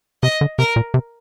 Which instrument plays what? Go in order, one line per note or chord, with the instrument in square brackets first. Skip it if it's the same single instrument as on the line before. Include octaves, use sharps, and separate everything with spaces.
[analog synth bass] C3 [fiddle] D#5
[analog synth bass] D3
[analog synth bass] C3 [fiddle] A#4
[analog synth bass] A#2
C3